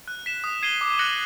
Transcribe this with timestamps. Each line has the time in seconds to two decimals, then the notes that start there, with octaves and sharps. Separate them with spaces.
0.08 F#6
0.26 B6 E7
0.44 D#6
0.63 G#6 C7 D#7 G7
0.81 D6
0.99 F#6 A#6 C#7 F#7